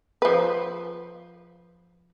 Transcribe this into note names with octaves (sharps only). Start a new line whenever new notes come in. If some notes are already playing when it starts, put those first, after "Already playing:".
F3 B4